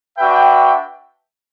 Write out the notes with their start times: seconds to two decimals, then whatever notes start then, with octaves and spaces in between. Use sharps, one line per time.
0.17 D4 F#4 B4 E5 G5